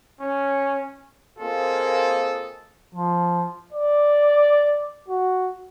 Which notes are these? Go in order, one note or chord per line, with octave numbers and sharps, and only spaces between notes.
C#4
A#3 C4 F4 G#4 A4 D#5
F3
D5
F#4